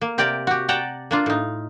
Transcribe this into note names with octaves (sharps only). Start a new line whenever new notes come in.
A#3
C3 G4 A#4 D5 G5
F#4 G4
D5 F#5 G5 A5 A#5
A#3 D4 F4
A2 D#4